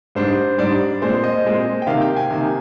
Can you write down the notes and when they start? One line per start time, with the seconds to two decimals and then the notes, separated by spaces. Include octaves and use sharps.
0.15 G#2 G3 D4 C5
0.58 G#2 G3 D4 D5
1.01 A#2 G#3 C4 C5
1.24 D#5
1.45 A#2 G#3 C4
1.82 G5
1.87 C3 D#3 A#3 F5
2.02 G5
2.17 G#5
2.30 C3 D#3 A#3